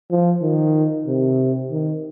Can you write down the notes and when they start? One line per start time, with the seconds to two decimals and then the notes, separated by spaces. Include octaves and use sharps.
0.11 F3
0.43 D#3
1.07 C3
1.72 D#3